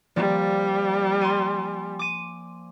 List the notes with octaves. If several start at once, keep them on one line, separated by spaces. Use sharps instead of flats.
F3 G3 A#3 D5
G#5 C6
D6 D#7